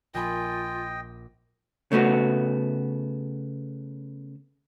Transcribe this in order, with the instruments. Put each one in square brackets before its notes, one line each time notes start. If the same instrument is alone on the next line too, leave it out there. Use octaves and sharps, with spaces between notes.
[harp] A#1 G#5 B5 [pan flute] F4 [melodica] D#5 G5
[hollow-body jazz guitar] C#3 A3 B3 F#4